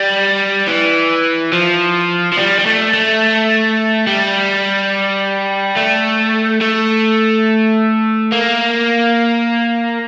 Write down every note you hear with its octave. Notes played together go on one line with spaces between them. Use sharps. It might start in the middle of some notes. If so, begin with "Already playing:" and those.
Already playing: G3
E3
F3
F3
G3
G3
A3
A3
G3
A3
A3
A#3